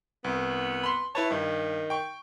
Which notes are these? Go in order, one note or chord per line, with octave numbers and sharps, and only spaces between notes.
C2 B3
B5 C6
E4 B4 C#5 A5
G2 D#3
G5 C#6